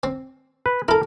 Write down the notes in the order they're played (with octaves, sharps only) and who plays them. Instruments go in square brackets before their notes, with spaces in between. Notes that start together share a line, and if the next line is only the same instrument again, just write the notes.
[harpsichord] C4
[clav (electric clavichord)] B4
[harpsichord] E4 A4 [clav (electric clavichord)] A#4